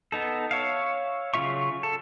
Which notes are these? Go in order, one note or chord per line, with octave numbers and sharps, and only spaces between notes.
B3 D#4 A4
C#5 E5 F5
C#3 F#3 F4 E5 C#6
A4